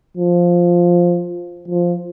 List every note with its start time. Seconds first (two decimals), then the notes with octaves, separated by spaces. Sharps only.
0.17 F3
1.68 F3